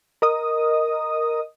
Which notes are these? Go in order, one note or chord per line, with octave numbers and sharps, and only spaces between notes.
A#4 D#5 D#6